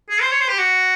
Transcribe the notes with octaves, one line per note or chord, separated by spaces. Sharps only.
G#4
C5
C#5
C5
G4
F#4